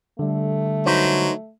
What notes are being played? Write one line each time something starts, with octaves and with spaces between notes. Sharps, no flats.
D3 G3 A3
F#3 D#4 B4 C5